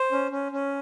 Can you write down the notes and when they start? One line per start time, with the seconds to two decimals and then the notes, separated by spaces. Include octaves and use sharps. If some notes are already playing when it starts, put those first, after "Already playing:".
Already playing: C5
0.12 C#4
0.31 C#4
0.52 C#4